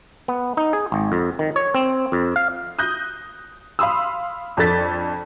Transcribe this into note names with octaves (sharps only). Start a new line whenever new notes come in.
B3
D#4
G#4
G#1
F2
D#3
C#5
C4
F2
F5
D#6 F#6 G6 A#6
F5 B5 C6 D#6 E6
F2 D4 A4 A6 B6